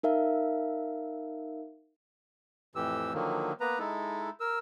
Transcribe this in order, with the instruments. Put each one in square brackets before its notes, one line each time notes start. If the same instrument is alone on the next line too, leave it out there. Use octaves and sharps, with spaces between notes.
[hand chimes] D#4 A#4 E5 F5
[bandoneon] F2 A2 E3 G4 E6
D3 D#3 F3 F#3 A#3
A#3 B3 B4 A#5
G#3 D#4 E4 A4
A#4 E6